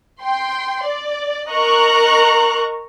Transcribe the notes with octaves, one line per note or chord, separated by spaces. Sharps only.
G5 C6
D5
A#4 D#5 A#5 C#6 F#6